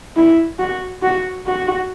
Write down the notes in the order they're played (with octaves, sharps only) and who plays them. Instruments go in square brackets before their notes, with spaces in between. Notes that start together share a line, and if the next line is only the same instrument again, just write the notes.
[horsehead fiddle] E4
F#4
F#4
F#4